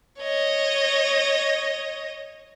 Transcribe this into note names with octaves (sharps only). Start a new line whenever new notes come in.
C#5 D#5